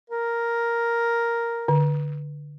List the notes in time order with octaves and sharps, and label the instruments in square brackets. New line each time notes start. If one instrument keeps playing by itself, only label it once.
[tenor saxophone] A#4
[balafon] D3